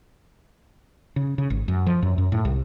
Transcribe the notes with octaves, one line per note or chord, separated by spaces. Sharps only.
C#3
C#3
G#1
F#2
F3
F#2
F#2
A2
C2